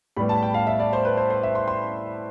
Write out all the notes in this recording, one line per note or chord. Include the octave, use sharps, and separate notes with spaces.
A2 G3 B3 B5
A5
G5
F5
E5
D5
C5
B4
C5
C5
E5
C6
C6